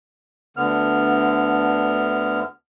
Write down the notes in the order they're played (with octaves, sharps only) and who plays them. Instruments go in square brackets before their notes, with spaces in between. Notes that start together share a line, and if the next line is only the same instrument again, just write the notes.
[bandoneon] D2 D3 B3 F6